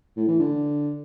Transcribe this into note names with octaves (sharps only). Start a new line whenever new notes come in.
A2
E3
D3